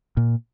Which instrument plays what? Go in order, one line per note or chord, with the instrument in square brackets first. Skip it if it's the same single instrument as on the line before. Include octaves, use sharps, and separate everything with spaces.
[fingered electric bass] A#2